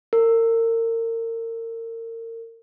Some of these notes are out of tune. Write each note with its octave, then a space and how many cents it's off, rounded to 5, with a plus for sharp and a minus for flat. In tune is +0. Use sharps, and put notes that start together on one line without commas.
A#4 -35